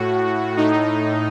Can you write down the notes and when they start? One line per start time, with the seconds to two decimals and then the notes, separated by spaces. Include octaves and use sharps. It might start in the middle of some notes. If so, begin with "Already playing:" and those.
Already playing: A2 F#4
0.57 A2 D#4